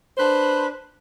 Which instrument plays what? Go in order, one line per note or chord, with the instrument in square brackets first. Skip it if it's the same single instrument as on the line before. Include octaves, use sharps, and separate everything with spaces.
[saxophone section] D4 B4 C5